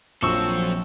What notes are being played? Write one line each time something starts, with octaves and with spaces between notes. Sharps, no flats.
A#1 F3 F#3 C4 A4 C#6 E6